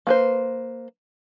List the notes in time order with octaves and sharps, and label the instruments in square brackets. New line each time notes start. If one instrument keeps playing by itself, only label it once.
[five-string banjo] A#3 B4 C5